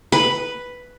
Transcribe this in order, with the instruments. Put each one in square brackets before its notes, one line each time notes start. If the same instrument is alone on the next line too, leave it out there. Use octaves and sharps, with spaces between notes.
[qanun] B4